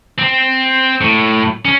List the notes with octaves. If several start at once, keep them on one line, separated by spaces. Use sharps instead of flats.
C4
A2
C#4